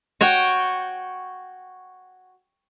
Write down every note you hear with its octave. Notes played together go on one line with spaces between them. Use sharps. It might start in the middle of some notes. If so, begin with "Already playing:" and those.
F#4 C#5 F#5 G5